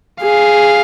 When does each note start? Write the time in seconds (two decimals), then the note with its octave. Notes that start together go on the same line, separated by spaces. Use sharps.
0.22 G#4 F5